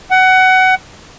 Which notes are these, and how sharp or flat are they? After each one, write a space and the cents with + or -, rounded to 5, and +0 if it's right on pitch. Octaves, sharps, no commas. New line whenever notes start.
F#5 +20